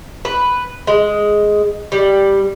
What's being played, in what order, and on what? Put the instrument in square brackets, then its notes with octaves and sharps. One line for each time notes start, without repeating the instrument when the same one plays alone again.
[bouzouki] B4
G#3
G3